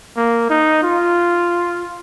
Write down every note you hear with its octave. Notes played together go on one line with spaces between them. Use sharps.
A#3
D#4
F4